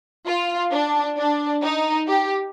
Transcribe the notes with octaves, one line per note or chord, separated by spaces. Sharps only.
F4
D4
D4
D#4
G4